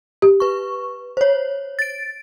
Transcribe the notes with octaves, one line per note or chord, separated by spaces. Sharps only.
G4
B4 C#6
C5 C#5
A6 D7